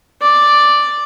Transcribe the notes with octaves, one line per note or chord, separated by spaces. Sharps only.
D5